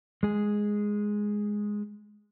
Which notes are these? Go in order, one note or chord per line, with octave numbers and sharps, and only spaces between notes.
G#3 G#4